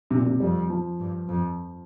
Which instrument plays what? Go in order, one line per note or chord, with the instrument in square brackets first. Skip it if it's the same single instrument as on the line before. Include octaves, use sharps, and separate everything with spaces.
[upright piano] C3
A#2
C3
[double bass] F2 [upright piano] G3
[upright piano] F3
[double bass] G2
F2